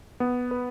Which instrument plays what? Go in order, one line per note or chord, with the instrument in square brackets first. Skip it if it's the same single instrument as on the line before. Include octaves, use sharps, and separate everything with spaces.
[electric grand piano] B3
B4